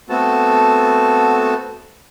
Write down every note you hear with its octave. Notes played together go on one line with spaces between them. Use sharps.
A3 B3 C4 F#4 A4 A5